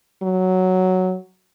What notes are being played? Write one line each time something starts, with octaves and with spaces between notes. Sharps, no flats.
F#3